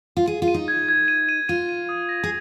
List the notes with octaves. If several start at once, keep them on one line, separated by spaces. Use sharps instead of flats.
F4
G#4 D#7
F4
D#7
D#4
G#6
G#6
D#7
D#7
F4 D#7
D#7
D#6
A#6
G#4